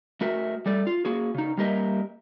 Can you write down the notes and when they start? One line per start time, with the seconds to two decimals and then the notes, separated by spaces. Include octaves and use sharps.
0.21 A3 F#4 A#4 E5
0.66 G3 A3 D5
0.87 F4
1.05 A#3 F#4 G#4
1.34 C#3 D#4
1.57 G3 A#3 G4 A#4 D#5 E5